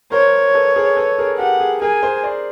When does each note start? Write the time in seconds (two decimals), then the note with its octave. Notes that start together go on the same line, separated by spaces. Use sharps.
0.12 A#4 C5 C#5
0.54 A4 B4
0.76 G#4 A#4
0.97 A4 B4
1.19 G#4 A#4
1.39 G4 A4 F#5
1.60 G#4
1.82 G#4 A#4 G#5
2.03 A#4 C5
2.24 C5 D5